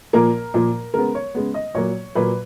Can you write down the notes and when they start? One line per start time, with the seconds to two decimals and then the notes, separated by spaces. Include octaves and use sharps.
0.13 A#2 F3 A#3 A#4
0.54 A#2 F3 A#3
0.94 C#3 G#3 B3 A#4
1.15 C#5
1.35 C#3 G#3 B3
1.54 D#5
1.75 A#2 F#3 A#3 C#5
2.15 A#2 F#3 A#3 B4